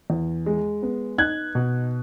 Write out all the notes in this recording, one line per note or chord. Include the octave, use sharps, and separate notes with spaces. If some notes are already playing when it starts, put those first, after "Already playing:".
E2
G#3
B3
D#4 F#6 G#6
B2